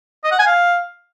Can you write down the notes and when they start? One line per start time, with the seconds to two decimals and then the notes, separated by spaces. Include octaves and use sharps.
0.24 D#5
0.32 F#5
0.39 G#5
0.47 F5